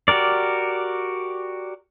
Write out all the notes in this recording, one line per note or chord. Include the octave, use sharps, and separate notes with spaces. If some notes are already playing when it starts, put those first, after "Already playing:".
F#4 G4 A#4 D5